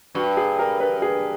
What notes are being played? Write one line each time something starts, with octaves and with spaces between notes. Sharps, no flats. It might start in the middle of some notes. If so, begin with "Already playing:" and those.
G2 F#4
G#4
A#4
B4
G#4